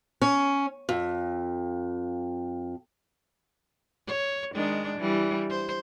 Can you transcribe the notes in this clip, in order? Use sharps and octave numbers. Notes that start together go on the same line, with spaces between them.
C#4
F2
C#5
D#3 G#3 D4
E3 G3
C5